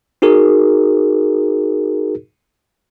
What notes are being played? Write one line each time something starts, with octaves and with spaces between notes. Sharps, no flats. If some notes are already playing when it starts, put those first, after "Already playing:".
D#4 F#4 G#4 A#4